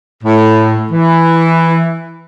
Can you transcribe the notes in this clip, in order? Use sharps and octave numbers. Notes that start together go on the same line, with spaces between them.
A2
E3